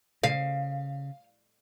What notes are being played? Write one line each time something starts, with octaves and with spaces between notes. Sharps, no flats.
C#3 F5